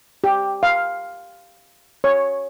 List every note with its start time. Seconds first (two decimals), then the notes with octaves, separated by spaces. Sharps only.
0.24 G4
0.63 F5
2.04 C#5